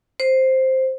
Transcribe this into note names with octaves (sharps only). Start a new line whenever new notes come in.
C5